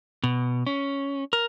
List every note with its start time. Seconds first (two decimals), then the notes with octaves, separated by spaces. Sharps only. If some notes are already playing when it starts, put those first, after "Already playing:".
0.24 B2
0.67 C#4
1.33 A#4